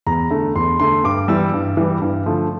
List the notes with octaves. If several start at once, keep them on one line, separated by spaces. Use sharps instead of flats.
E2 A#5
D3 A3
E2 C6
D3 A3 C6
G2 D6
E3 G3 E6
G2
E3 G3
G2
D3 F3 A3